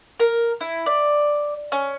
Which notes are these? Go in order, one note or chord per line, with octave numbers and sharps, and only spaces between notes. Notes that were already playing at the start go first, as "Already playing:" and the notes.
A#4
E4
D5
C#4